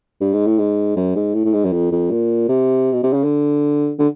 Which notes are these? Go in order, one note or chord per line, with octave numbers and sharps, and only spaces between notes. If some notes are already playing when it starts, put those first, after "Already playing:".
G2
G#2
A2
G#2
F#2
G#2
A2
A2
G#2
F#2
F2
F2
A#2
C3
B2
C3
C#3
D3
D3